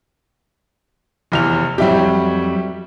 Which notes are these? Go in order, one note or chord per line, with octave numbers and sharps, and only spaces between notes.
F1 E2 F7
F2 F#3 G3 E4 G4